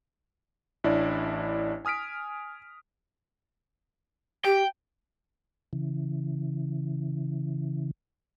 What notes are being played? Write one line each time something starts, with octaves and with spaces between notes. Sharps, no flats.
A1 D4 E4 C#5 D5
G#5 D#6 F6 B6 D7
G4 G5
C#3 E3